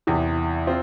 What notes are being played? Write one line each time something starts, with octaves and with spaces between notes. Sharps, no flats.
E2 C3 E3
C4 F4